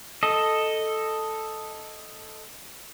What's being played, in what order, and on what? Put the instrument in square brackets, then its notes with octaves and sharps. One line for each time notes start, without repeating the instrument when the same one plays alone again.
[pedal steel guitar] A4 D#5